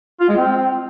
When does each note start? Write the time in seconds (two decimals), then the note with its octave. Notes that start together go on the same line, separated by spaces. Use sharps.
0.21 F4
0.29 G#3
0.37 C4